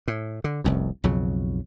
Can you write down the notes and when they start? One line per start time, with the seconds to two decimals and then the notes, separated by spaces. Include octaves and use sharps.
0.08 A2
0.44 D3
0.64 F1 C2 F#2
1.04 B1 F2 C#3 F#3